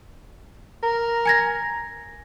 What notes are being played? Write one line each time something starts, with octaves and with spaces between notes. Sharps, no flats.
A#4
G#5 G#6 A#6